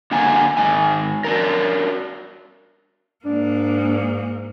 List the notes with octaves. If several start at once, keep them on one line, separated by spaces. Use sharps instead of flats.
D3 A#3 F#4 F#5 G#5 A#5
G#2 D#3 G#5
D4 F#4 A#4
G#2 A#3 D4